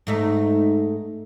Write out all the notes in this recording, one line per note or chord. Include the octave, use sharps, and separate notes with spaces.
G#2 A3 D#4